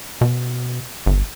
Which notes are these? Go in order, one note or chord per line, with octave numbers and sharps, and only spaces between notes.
B2
G1